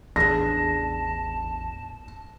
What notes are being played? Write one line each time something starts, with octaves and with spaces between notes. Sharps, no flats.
A1 E2 D4 G#4 A5 A#6